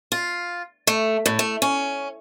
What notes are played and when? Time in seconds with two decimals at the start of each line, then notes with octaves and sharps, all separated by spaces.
0.12 F4
0.87 A3
1.26 A2
1.39 A3
1.62 C#4